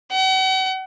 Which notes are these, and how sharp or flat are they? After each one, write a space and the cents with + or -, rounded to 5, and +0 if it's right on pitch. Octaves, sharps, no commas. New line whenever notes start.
F#5 +45